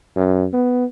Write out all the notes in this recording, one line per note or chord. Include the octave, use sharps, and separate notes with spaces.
F#2
B3